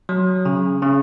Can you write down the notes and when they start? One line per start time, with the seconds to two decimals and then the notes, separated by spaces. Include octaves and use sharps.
0.09 F#3
0.45 C#3
0.82 C#3